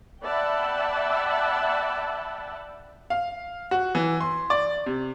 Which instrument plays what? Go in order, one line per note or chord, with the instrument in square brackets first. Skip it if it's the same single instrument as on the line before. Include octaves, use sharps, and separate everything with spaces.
[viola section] D5 E5 F#5 G5 A5 B5
[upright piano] F5
F#4
E3
C6
D5
C3